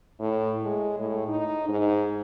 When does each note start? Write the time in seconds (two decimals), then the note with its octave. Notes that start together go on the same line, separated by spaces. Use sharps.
0.20 A2
0.63 G#3
0.99 A2
1.28 D#4
1.68 G#2